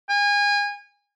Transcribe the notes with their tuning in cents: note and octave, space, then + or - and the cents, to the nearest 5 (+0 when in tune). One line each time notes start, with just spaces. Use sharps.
G#5 -30